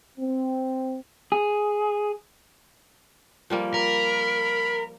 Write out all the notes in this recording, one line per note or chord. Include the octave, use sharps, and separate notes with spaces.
C4
G#4
F3 G3 A#3
A#4 B5